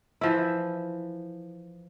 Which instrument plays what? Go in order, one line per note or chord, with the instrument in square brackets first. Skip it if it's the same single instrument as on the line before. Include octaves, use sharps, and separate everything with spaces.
[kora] E3 F3 E4